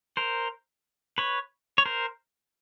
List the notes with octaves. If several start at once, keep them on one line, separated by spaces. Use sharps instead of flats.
A#4 C5
B4 C#5
C#5
A#4 C5